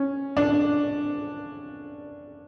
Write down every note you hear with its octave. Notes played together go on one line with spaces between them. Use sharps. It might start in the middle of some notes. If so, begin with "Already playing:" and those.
Already playing: C#4
D4